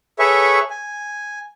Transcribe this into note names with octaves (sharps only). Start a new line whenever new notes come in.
G#4 A4 B4 C#5 E5 C#6
G#5